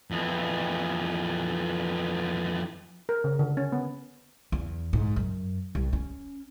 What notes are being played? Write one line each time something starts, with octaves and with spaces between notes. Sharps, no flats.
F2 E3
A#4
C#3
D3
C#4
B3
E2
G#2
F#2
C2
C#4